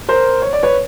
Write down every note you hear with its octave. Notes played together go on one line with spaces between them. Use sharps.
A#4 C5
C#5
D5
B4 C#5